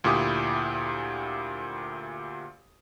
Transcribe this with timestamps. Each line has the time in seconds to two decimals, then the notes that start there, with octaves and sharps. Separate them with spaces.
0.04 D2 A#2 E4 G4 D6 D#6